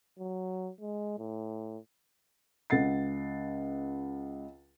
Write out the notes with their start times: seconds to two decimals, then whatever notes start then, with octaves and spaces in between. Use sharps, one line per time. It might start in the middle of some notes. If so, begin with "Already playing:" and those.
0.19 F#3
0.81 G#3
1.18 A2
2.70 C#2 F#5 A6 C7